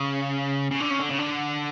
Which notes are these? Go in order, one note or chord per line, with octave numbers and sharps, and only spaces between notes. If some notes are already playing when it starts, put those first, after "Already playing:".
Already playing: C#3
C#3
D3
C#3
D3
C#3
D3